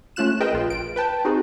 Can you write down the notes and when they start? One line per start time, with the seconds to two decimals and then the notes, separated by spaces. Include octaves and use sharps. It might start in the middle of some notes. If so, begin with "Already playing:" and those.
0.16 A3 C#4 F4 F#6 E7
0.40 G#4 A#4 B4 D#5 G5
0.53 A#1 F4
0.70 D7
0.96 B4 G5 A5
1.25 C4 D#4 F#4 G#4